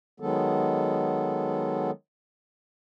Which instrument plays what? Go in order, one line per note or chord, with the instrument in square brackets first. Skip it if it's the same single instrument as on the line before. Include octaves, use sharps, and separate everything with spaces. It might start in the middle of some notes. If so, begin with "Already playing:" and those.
[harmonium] D#3 F#3 G#3 B3 A4